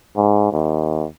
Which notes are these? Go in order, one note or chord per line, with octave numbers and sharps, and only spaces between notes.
G#2
D#2